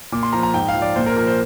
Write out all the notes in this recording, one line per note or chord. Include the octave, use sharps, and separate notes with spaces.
A#2 D6
C6
F3 A#5
A#5
G#2 G5
F5
F3
D5
A#2 C5
A#4
F3 A#4
C5